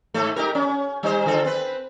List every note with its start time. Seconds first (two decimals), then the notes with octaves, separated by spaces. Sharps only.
0.14 G#2 A3 A4
0.36 D#4 G4 A#4
0.55 C#4
1.03 G3 D#4 C5
1.26 D3 F4 A4
1.44 C4 B4